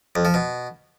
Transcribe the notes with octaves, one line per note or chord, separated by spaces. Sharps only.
F2
F3
B2